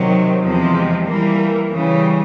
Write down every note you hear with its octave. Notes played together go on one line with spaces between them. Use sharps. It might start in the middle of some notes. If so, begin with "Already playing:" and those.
Already playing: C3 D#3 F#3
E2 C3 F3 G#3
E3 G3 A#3
C#3 E3 G3